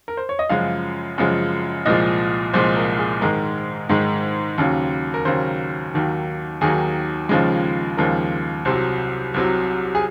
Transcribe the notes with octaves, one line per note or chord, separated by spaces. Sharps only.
A#4
C5
C#5
D#5
F#2 C#3 F3 G#3 F5
F#2 C#3 F3 G#3
C2 A#2 F3 G#3 D#5
C2 A#2 F3 G#3 C5
A#4
G#4
G#2 D#3 G#3 A#4
G#2 D#3 G#3
D#2 C#3 F#3
A#4
D#2 C#3 F#3 C5
D#2 D#3 F#3
D#2 D#3 F#3 G#4
D#2 C#3 F3 G#3
D#2 C#3 F3 G#3 A#4
C2 C3 F#3 C5
C2 C3 F#3
G#4